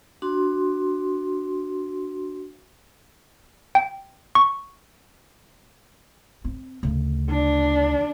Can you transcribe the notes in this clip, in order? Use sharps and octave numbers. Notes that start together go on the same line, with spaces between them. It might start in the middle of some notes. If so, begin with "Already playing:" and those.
D4 F#4 C6
G5
C#6
C4
D2 C#3
D4